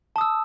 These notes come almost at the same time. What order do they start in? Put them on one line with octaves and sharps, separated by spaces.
A5 D#6 E6